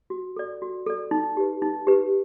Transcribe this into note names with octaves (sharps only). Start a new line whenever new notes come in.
F#4
A4 D5
F#4
A4 D5
D#4
G4 B4
D#4
G4 B4